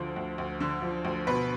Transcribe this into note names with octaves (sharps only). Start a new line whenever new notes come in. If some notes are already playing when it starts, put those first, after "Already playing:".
Already playing: D2 D3 F3
D2
D2
D3
F3
D2
B2 B4